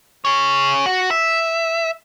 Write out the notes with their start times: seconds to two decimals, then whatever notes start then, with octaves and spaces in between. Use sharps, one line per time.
0.25 G#4 C#5
0.86 F#4
1.11 E5